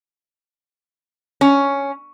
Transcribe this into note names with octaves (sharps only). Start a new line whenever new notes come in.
C#4